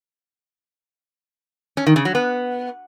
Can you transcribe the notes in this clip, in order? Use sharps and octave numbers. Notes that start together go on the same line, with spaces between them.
C#4
D#3
C#3
F#3
B3